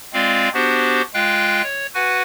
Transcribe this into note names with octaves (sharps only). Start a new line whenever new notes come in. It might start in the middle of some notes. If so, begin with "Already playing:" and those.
G#3 C4 F4 D5 F5
B3 D4 F#4 G4 C5
G#3 F4 F5 G5 F#6
C#5
F#4 B4 F#5 G#5